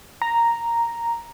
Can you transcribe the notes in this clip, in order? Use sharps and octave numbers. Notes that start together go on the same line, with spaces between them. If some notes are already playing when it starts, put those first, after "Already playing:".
A#5